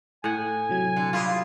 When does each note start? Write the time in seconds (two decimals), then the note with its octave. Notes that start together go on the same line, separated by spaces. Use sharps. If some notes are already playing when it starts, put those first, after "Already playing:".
0.24 A2 F#5 G#5
0.69 C3 F#3 G#6
0.96 D3
1.13 G3 E4 F4 D#5